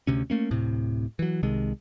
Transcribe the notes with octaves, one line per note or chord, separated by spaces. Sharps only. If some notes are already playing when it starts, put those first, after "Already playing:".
D2 C3 C#4
A3 A#3 C#4
D1 A2 C3
E3 F#3
C2 C3 D#3 G#3